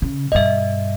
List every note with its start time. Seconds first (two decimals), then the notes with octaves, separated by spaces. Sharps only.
0.02 C#3
0.32 G2 B2 D#5 E5